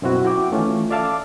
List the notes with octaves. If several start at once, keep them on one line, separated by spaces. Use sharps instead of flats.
F#2 B2 C4 E4 F#4
E4 F#4 F#5 G5 D6
D#3 E3 A3 C#4 F4
A4 D5 E5 F5 A5 D6